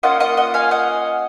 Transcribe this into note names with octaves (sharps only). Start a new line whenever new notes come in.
A#3 C#4 F4 D#5 F#5
D#5 F#5
D#5 F#5
F5 G#5
D#5 F#5